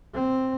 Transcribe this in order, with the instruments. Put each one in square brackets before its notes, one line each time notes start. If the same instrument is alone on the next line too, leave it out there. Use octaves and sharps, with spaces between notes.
[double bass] C4